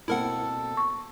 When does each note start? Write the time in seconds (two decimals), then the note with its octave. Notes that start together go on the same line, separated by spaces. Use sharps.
0.08 B2 A#3 C4 E4 A4 A#4 F#5
0.77 C#6